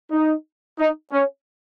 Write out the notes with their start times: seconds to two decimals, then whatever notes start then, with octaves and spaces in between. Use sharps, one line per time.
0.11 D#4
0.79 D#4
1.13 C#4